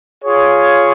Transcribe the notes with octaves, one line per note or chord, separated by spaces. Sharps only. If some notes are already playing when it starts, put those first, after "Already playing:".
F4 G#4 C#5